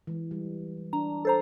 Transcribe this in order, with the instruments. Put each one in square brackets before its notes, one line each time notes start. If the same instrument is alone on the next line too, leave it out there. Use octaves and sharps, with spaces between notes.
[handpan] E3 G#3
G3
[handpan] D4 [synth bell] A#5
[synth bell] A4 C5 A#5